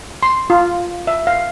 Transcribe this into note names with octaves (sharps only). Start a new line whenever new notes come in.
C6
F4
E5
F5